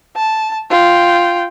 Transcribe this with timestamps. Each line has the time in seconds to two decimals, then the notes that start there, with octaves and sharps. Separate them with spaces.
0.16 A5
0.70 F4 G5